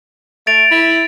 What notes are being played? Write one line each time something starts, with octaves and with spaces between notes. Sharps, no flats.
A3 A6 D7 F7
E4